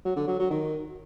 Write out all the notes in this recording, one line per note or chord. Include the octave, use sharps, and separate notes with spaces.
F#3
D3
F#3
F#3
D#3